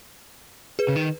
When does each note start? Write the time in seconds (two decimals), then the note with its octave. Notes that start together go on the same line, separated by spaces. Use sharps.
0.79 G#4 B4
0.88 C#3
0.96 D#3